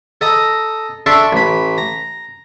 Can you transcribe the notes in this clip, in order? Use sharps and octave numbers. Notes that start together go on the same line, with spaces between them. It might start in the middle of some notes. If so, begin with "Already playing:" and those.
A4 D#5 A#5
D4 A4 E5 C6 C#6
A1 B5
A#5